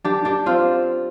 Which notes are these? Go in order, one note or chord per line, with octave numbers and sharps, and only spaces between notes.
D4 G4
D4 G4
C4 F4